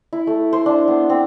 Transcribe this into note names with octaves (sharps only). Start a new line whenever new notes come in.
E4
A3
C5
D4
B3
C4